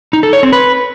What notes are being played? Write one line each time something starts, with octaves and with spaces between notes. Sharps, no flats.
D#4
A4
C#5
C4
B4